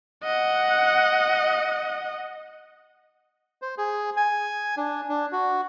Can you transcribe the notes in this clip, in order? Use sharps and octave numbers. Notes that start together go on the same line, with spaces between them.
D#5 F#5
C5
G#4
G#5
D4
D4
F#4